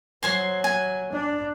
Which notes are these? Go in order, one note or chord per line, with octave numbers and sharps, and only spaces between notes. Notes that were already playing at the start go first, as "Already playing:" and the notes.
F#3 C5 G#5 C6
G#5
D4